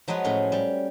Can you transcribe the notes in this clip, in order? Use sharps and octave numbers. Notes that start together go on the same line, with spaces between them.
F3 F#3 G#3 B4 C#5
A2 C#4 C6
G3